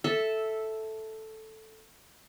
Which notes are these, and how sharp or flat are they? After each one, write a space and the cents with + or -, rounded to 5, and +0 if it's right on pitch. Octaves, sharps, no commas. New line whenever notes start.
A4 +0 E5 -5